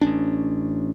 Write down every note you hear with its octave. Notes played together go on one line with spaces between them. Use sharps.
A1 C#4 D4